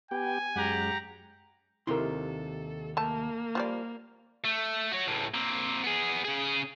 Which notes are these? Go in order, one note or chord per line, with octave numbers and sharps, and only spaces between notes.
B3 G4 G5 G#5
F#2 G#3 G4 F#5 A#5
D#2 C3 E4 A4 A#4 C6
A3 A#3 A5
F3 G3 D5
A3
F#4 C#5
C#2 A2
A#3 C4
B3 G#4
C#3 G#4